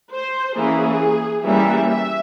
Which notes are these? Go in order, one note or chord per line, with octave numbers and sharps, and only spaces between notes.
C5
E3 A#3 C#4 G#4
E3 G3 A#3 C#4 E5
E5